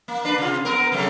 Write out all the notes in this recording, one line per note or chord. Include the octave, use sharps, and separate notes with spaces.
A#3
D4 B4
C3 F4
B3 A#4
C3 F#3 A3